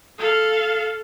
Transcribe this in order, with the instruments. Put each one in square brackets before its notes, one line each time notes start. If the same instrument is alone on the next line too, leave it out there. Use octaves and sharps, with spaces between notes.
[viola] A4 F5